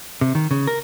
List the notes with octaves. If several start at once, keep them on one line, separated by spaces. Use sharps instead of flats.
C3
D#3
C#3
A#4